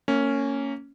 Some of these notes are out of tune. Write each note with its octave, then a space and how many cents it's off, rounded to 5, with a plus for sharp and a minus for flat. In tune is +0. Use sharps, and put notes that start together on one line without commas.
A#3 -25 C#4 +0